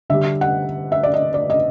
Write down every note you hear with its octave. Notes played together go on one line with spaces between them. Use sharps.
D3 G3 E5
F#5
E5
D5
D#5
D5
D#5